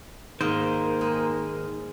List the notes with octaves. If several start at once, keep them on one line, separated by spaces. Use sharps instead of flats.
G#2 D#3 A#3 A#4 C5
G#3